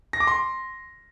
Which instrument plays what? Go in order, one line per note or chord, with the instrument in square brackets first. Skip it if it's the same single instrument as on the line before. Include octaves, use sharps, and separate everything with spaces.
[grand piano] A#6
D6
C6